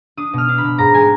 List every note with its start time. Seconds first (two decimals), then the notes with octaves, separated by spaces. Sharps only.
0.17 D4 D#6
0.33 B2 F6
0.48 D4
0.58 B5
0.64 B2
0.78 G#2 A#5
0.94 G#3 G#5